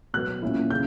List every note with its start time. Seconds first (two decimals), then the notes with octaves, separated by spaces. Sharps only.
0.14 B2 F#3 B3 F#6
0.42 A#2 F#3 C#4 E4
0.70 C#3 G6